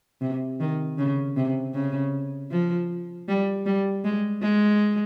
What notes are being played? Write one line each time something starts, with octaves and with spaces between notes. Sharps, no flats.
C3
D#3
C#3
C3
C#3
F3
G3
G3
G#3
G#3